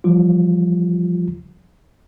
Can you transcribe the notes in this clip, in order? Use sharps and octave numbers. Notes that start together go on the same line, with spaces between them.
E3 F3 G3 F4